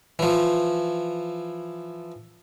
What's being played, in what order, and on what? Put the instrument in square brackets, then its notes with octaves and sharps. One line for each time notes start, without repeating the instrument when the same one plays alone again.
[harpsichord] E3 F3